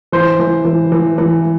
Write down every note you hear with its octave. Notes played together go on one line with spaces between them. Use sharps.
E3 C5
E3
E3
E3
E3